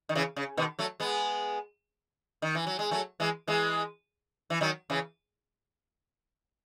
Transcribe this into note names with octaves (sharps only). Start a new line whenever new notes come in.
D#3
C#3 E3
C#3
B2 D#3
F#3 A3
G#3 B3
D#3
E3
F#3
G#3
F#3 A3
E3 G#3
E3 G#3
E3
D#3 F#3
C#3 E3